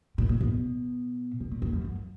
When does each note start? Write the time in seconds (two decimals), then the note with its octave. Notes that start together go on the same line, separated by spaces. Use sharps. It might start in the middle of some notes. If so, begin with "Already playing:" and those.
0.18 A#2
0.29 A#2
0.40 B2
1.40 B2
1.51 A#2
1.62 F2
1.73 F#2
1.84 F#2